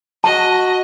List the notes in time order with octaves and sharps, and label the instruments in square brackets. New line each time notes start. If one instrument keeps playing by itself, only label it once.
[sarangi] F#4 [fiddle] D#5 [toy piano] A5